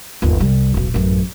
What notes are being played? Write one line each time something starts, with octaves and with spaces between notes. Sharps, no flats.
G1 D#2
C2 G3
E1 B1
A1 F#2